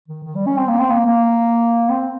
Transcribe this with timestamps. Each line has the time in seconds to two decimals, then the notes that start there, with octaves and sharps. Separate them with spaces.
0.08 D#3
0.24 D#3
0.35 G3
0.46 C#4
0.58 C4
0.68 A#3
0.79 C4
0.90 A#3
1.07 A#3
1.90 C4